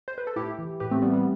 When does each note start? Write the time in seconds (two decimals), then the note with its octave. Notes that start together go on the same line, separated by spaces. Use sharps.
0.08 C5
0.18 B4
0.27 A4
0.36 A2 E4 G4
0.59 E3
0.80 A2 G4 B4
0.91 A3 C4
1.02 E3 G3 B3
1.13 G3 B3